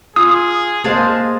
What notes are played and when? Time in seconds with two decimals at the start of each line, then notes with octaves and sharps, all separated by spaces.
0.16 F4 G#4 D#6
0.84 G#3 A#3 G#4 C5 D#5 F5 A5